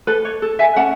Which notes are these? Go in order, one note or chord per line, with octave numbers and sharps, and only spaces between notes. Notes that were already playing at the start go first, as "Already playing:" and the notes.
A4 B4
C#5
A4
E5 G#5
C#4 F#5 A5